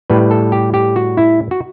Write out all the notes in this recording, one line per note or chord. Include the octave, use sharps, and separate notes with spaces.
A2 G3 B4
A4
G4
G4
F#4
E4
F#4